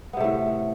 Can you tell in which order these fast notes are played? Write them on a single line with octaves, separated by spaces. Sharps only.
B3 C3 A3 A2